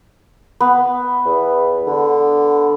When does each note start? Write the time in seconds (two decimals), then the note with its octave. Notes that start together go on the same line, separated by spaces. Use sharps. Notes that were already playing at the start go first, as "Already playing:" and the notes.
0.60 B3
1.25 E2
1.87 D3